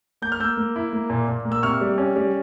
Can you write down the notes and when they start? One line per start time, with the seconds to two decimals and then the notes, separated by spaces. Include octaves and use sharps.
0.22 A#3 G6
0.32 F6
0.40 A#3 E6 G6
0.57 A#3
0.76 E4
0.93 A#3
1.10 A#2
1.28 A#2
1.45 A#3
1.52 E6
1.63 C3 C#6 F6
1.81 G3
1.98 C#4
2.16 G3